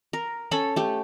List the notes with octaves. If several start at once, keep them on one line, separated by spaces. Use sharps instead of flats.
A#4
C#4 A4 B5
A3 G4